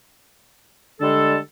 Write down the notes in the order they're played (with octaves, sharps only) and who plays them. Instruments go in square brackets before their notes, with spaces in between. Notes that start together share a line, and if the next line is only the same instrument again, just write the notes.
[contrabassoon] D3 [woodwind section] G3 G#3 A4